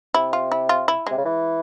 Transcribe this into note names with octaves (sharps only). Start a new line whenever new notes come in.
C3 E4
F4
E4
F4
E4
C3 G#3
C#3
E3